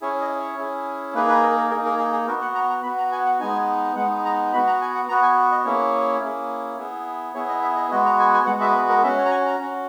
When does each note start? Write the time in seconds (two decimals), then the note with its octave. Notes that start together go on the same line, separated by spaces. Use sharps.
0.01 C#4 E4 G#4 C#5
0.21 D#5
0.40 C#5
0.58 C#4 E4 G#4
1.14 A#3 D#4 G#4 B4
1.28 B4
1.42 A#4
1.57 A#4
1.71 A#3 D#4 G#4 A#4
1.86 A#4
1.99 G#4
2.13 G#4
2.28 B3 F#4 A#4
2.42 F#5
2.55 A#5
2.70 A#5
2.83 B3 F#4 B5
2.98 A#5
3.12 G#5
3.26 F#5
3.40 G#3 B3 D#4 G#5
3.96 G#3 B3 D#4 F#5
4.25 A#5
4.53 B3 F#4 B5
4.67 A#5
4.81 G#5
4.95 F#5
5.09 B3 F#4 A#5
5.23 G#5
5.52 D#5
5.65 A#3 C#4 E4 G#4 C#5
6.21 A#3 C#4 E4 G#4
6.78 B3 E4 G#4
7.35 B3 E4 G#4 C#5
7.49 D#5
7.62 E5
7.76 D#5
7.91 G#3 B3 F#4 D#5
8.05 A#5
8.20 G#5
8.34 G#5
8.47 G#3 B3 F#4 F#5
8.61 E5
8.75 B4
8.89 A#4
9.03 C#4 F#4 E5
9.18 C#5
9.25 A#5
9.31 G#5
9.46 A#5
9.60 C#4 F#4